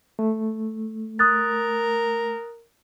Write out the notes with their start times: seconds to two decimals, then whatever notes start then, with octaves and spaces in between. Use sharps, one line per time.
0.19 A3
1.19 A#4 D#6 F#6 A6